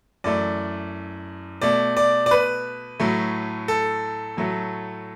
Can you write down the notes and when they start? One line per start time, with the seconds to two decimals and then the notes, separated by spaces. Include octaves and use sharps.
0.24 F#2 E3 A3 D5
1.62 B2 A3 D5
1.97 D5
2.26 D5
2.31 B4
3.00 A2 F#3 A3
3.68 A4
4.37 A2 F#3 A3